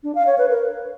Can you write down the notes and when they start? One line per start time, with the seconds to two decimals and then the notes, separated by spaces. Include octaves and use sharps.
0.03 D4
0.15 F5
0.27 C#5
0.38 B4
0.50 A#4